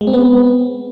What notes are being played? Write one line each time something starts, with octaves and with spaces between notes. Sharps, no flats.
G#3
C4
B3